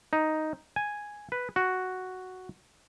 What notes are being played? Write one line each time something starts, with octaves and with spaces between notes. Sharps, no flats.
D#4
G#5
B4
F#4